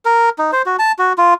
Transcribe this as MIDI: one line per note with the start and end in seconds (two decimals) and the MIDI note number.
0.05 0.30 70
0.38 0.51 63
0.53 0.62 72
0.66 0.76 66
0.79 0.92 81
0.99 1.13 66
1.18 1.34 65